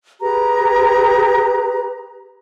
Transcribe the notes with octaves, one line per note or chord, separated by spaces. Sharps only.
G4 G#4 B4 A#5